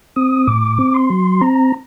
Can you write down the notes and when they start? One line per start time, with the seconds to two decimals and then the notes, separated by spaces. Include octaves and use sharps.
0.16 C4 D#6
0.47 A2 D6
0.79 C4
0.94 C6
1.10 F#3
1.41 C4 A#5